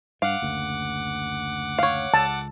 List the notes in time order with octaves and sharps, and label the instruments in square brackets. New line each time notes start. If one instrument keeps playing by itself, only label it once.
[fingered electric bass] G2 [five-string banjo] F5 [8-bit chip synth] F#5 D6
[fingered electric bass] F#1 D2
[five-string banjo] C#5 F5
[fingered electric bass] C#2 [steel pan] A5